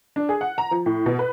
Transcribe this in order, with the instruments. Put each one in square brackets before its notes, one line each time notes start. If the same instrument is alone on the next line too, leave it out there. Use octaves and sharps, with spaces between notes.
[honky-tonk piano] D4
G#4
F#5
A#5
F3
A2
B2
B4